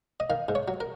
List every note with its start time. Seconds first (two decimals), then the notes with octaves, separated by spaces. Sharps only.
0.20 D#5
0.30 D#3 F5
0.49 G#2
0.55 C#5
0.68 F#3
0.80 A#4